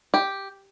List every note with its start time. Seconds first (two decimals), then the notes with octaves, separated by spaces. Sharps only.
0.14 G4